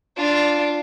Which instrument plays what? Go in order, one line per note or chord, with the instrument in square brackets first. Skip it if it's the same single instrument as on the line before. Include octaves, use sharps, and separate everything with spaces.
[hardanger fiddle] D4 F4